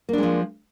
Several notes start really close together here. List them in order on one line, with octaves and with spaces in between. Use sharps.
A#3 D4 G#3 F3